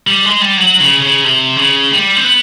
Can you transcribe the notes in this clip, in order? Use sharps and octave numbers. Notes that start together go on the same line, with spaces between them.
G3
G#3
G3
F#3
C#3
C#3
C3
C#3
G3
C4
B3